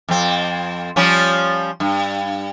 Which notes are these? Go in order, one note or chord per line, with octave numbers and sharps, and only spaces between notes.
F2 C4
F3 G3 C#4
G2